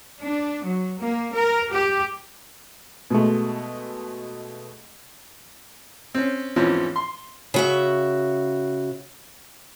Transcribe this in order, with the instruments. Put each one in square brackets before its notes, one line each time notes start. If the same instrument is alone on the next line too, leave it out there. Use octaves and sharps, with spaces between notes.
[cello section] D4
F#3
A#3
A#4
G4
[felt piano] B2 G#3 A3
[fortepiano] C4 C#4
E2 G#2 E3 F3 C4 C#4
C6
[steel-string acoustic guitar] C#3 F#4 E5